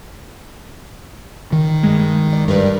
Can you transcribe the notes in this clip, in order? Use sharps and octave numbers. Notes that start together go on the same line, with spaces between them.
D#3
G2 G#3
D5
G2 A#4 B4 D5